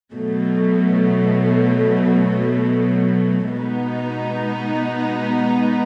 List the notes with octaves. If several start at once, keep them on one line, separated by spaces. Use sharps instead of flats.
B2 F#3 A3
B2 G#3 B3 D#4